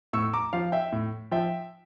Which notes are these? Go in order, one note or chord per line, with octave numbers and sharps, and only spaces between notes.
A2 C#6 E6
A#5 D6
F3 F5
E5 G5
A2
F3 E5 G5